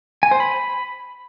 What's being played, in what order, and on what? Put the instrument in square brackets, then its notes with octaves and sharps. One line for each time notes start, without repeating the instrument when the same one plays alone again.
[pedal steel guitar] G#5
C5
B5